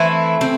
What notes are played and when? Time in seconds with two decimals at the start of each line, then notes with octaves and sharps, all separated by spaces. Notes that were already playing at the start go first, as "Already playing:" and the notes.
Already playing: E3 A3 C4 E4
0.41 C4